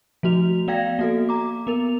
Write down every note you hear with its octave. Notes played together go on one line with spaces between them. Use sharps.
F3 A3 F#4 F7
B3 D5 F5 G5 G#6 A#6
A#3 F#4 A4
A#5 D6
B3 A#4 F7